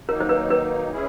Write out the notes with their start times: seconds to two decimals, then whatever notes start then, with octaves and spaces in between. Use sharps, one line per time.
0.09 D#3 F#3 A#3 D#4 A#4
0.20 C5
0.29 B4
0.50 B4
0.91 G#3 C#4 E4 G#4